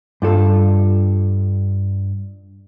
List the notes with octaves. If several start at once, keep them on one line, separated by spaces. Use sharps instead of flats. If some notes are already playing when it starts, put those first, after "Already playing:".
G2 F4 A4